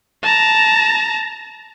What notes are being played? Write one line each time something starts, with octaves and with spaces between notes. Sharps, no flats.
A5 A#5